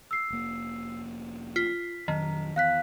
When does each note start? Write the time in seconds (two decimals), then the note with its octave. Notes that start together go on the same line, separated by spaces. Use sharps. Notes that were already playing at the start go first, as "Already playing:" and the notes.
0.11 E6 C7
0.30 F1 A#3
1.56 F4 B6
2.08 A#1 F2 D#3 F#3
2.56 E2 F5 F#6 B6